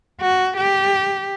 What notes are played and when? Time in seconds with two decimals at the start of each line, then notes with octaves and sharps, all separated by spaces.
0.21 F#4
0.57 G4